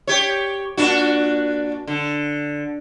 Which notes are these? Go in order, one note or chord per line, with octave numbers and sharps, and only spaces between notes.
G4 C#5
A#2 D4 F#4
D3